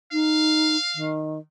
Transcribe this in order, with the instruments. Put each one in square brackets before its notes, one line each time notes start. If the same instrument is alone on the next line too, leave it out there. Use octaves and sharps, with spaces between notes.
[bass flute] D#4 [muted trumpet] F5
[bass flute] D#3